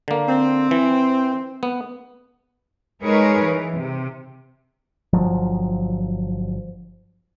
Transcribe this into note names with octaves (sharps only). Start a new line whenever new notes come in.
D3 A#3
C4
E3
B3
G#3 D#4 G#4 A#4 B4 C#5
E3
C3
G1 F3 F#3